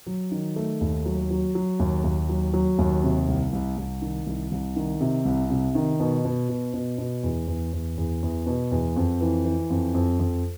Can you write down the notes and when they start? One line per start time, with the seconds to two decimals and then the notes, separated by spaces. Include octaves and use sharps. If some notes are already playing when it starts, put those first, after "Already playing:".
0.06 F#3
0.31 D#3
0.56 A3
0.81 D#2
1.05 F#3
1.30 F#3
1.55 F#3
1.79 D#2
2.04 D#2
2.29 F#3
2.53 F#3
2.78 D#2
3.03 C3
3.28 C2
3.53 C2
3.78 C2
4.01 D#3
4.27 C2
4.52 C2
4.76 D#3
5.00 C3
5.25 C2
5.50 C3
5.75 D#3
6.00 B2
6.25 B2
6.49 B2
6.74 B2
6.98 B2
7.23 E2
7.47 E2
7.73 E2
7.97 E2
8.23 E2
8.46 B2
8.71 E2
8.96 F2
9.21 E3
9.45 E3
9.70 F2
9.94 F2
10.19 F2